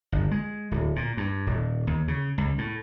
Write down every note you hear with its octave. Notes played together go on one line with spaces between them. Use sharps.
G1
G#3
D1
A#2
G2
D#1
D#2
C#3
C#2
A2